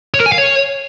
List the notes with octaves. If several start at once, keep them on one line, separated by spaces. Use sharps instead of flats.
C#5
A#4
G#5
F5
C#5